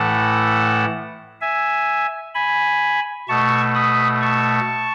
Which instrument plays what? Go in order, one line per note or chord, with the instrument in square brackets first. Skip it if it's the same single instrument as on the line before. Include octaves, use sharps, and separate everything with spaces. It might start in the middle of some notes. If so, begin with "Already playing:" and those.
Already playing: [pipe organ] A2 E3 A3 F#5 A5
E5 G#5
G#5 B5
B2 A3 A5 C#6
B5 D#6
A5 C#6